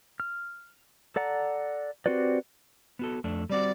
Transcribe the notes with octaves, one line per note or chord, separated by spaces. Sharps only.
F6
A4 D5 F#5 A#5
C4 F#4 G4 B4 D5
B3 F#4 A4
F2 A3 D4
G3 C4 F#4 D5